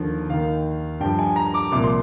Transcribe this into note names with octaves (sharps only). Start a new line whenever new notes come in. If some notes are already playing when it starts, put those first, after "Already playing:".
Already playing: D#2 D3 F3
D#2 D#3 F5
G2 F3 G5
G#5
A#5
D6
C2 A#2 F3 D6
C6